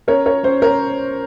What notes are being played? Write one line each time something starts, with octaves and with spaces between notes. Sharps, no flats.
C#4 A#4 C#5
A#4 C#5
C#4 C5
A#4 C#5